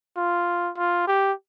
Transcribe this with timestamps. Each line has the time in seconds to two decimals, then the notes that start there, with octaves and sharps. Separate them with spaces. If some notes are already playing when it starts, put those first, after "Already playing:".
0.17 F4
0.77 F4
1.07 G4